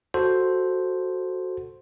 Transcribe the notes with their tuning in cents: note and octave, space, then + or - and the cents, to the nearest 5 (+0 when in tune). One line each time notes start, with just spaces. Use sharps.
F#4 +0 A4 +0 C5 +0